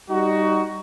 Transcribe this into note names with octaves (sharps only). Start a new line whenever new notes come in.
G3 D#4 F#4